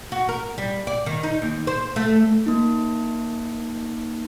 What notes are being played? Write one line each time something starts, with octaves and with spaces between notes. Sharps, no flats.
F#4
A#4
G3
D5
D#3
D#4
D#2
C5
A3
A#3 D#4